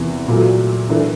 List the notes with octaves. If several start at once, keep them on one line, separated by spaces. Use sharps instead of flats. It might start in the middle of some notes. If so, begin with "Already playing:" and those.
Already playing: E2 C3 E3
A#2 F#3 A3
E3 A3 D4